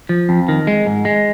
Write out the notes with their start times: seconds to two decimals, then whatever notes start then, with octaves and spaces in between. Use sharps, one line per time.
0.09 F3
0.29 F2
0.48 D#3
0.67 G#3
0.86 G#2
1.05 G#3